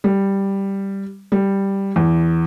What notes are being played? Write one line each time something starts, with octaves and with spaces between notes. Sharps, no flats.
G3
G3
E2